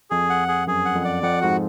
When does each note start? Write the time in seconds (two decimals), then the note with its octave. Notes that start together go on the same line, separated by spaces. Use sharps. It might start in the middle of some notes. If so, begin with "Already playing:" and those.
0.11 F2 G#4
0.30 F#5
0.48 G#4
0.67 F#2 G#4
0.85 F#5
0.95 F2
1.04 D5
1.23 F2 F#5
1.41 G#2 F#4